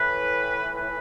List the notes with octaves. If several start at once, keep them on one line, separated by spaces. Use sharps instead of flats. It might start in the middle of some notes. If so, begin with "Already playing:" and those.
Already playing: A2 E3 B4
B4